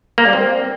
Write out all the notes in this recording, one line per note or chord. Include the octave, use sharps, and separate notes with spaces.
A#3
G3
C4